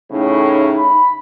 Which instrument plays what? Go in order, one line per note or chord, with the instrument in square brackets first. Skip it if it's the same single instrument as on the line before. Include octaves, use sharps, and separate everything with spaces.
[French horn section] A2 C#3 [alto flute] D#4
[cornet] B5